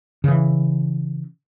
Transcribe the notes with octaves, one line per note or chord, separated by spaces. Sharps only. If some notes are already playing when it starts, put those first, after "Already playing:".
C#3 E3